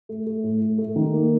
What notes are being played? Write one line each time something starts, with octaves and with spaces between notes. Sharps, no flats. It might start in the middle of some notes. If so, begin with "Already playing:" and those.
A3
A3
A2
A2
A3
D#3
A#3